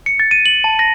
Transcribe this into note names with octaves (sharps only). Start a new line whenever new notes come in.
C#7
A6
D#7
F#7
A5
A#6